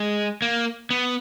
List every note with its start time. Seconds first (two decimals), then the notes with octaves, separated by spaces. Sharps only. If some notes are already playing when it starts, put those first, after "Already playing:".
Already playing: G#3
0.42 A#3
0.90 B3